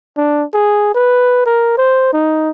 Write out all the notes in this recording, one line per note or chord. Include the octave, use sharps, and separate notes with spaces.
D4
G#4
B4
A#4
C5
D#4